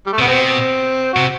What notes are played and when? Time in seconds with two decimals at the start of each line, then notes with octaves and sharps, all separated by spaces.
0.06 G3
0.13 A3
0.19 C3 B3
0.27 B2 C4
1.13 C3 F#4